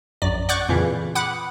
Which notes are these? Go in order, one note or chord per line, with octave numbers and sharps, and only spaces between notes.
A#1 F#2 D5
D5 F#5 C#6 D6 F#6 G6
F2 A#2 C#3 E3
F#5 B5 D6 D#6 F#6